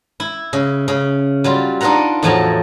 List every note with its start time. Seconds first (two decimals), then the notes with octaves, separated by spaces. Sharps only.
0.20 E4
0.53 C#3
0.88 C#3
1.44 F#3 G3 F4
1.81 D4 D#4 F4 B4 F#5 A#5
2.23 E2 A2 F3 F#3 A4 A#5